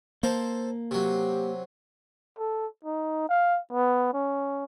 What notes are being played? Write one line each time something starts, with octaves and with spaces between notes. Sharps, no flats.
A#3 A4 C5
C3 F#3 G4
A4
D#4
F5
B3
C#4